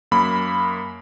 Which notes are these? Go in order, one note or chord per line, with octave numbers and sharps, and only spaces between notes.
F#2 A#3 B5